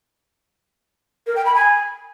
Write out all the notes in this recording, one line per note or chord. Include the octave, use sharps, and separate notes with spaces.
A#4
G5
B5
G#5